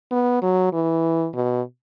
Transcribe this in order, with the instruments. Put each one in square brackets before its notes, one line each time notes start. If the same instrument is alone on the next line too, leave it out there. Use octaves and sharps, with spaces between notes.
[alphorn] B3
F#3
E3
B2